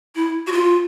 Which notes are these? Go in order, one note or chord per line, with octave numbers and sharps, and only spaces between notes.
E4
F#4
F4